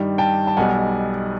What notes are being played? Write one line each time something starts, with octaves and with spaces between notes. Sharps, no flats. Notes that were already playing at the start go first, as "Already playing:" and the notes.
Already playing: G2 D#3 G3
G5 A5
A5
B1 B2 G3 F#5 G#5